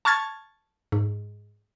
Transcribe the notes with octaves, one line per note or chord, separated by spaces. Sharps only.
A5 C#6 F6 G#6 A6
G#2